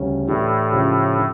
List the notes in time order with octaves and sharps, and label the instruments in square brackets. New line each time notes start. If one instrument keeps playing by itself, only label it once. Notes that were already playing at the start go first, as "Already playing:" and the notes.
Already playing: [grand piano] D2 C#3 G3 C#4
[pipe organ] A2 [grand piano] E3 A3 D4 G4
[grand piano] C#3 F3 C#4 G4
D3